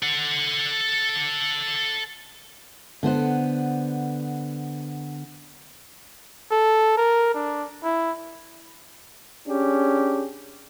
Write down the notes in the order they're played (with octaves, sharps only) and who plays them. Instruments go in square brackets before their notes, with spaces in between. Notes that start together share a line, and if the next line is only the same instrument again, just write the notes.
[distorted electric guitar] A4 F#5
[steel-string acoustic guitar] D3 B3 C5 F#5
[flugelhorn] A4
A#4
D4
E4
[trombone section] C#4 D4 G4 G#4